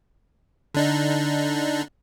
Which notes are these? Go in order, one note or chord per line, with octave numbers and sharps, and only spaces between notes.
D3 D4 D#4